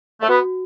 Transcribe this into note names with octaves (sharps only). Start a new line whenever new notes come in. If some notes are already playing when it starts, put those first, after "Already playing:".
A3
B3 F#4